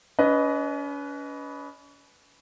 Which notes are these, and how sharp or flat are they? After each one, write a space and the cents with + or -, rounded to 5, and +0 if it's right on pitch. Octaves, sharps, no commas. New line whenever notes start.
C#4 +40 B4 +0 D#5 +0